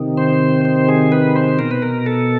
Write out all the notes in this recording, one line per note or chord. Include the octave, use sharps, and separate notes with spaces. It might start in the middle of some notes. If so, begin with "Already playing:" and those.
Already playing: C3 D#3
C5
C5
G#4
B4
C5
B2 A#4
B4
A#4
A4